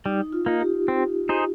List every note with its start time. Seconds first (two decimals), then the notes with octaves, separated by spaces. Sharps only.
0.05 G3 D#4
0.32 F4
0.46 A#3 D#4
0.61 G4
0.88 C4
1.29 D#4 G#4 C5